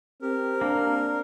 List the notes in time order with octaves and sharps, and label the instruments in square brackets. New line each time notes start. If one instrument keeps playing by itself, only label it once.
[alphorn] C4 [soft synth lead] G4 [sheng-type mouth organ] A#4
[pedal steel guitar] A#3 [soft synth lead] D4